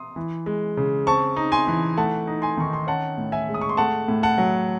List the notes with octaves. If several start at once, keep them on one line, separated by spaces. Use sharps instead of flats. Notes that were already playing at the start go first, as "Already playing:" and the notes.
Already playing: C6 D#6
E3
G#3
C#3
C4 A5 C#6
D#4
G#5 C6
E3
A3 F#5 A5
D#4
G#5 C6
D#3 C#6
C6
C#4 F#5 A5
A2
E5 G#5
G#3
D#6
C#6
C6
A3 F#5 A5
A2
F#5 A5
F#3